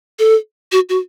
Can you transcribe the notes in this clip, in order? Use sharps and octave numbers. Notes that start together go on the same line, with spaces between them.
A4
F#4
F#4